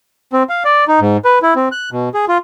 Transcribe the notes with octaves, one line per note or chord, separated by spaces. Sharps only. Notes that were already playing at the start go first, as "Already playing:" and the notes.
C4
F5
D5
D#4
G#2
B4
E4
C4
F#6
B2
G#4
F4